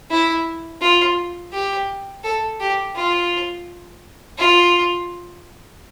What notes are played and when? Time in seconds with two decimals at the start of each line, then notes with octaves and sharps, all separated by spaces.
0.11 E4
0.81 F4
1.53 G4
2.24 A4
2.60 G4
2.96 F4
4.38 F4